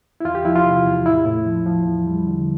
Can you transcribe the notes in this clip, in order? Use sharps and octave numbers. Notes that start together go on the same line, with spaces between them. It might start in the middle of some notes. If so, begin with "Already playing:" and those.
E4
E2 F4
G4
F3 E4
F4
C3
E2
A2 E4
A2
F3
F3
E2
G3
D3